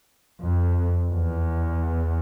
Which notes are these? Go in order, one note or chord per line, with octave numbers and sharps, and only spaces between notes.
F2
E2